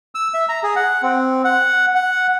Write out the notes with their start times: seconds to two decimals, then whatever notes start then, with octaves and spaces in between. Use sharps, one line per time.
0.15 E6
0.34 E5
0.49 A#5
0.63 G#4
0.76 F#5
1.03 C4
1.44 F#5
1.95 F#5